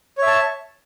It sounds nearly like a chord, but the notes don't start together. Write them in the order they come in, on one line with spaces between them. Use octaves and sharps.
C#5 E5 A5